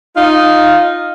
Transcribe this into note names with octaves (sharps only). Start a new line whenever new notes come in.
D#4 F4